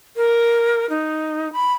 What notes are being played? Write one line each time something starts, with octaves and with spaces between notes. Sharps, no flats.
A#4
D#4
B5